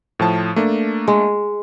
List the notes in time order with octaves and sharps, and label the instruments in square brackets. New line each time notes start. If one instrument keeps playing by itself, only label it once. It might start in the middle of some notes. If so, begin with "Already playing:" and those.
[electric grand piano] A2 F3 A5
A3 A#3 D4
[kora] G#3